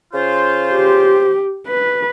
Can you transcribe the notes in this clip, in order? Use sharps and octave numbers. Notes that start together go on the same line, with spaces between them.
C#3 F4 C5
G4
B4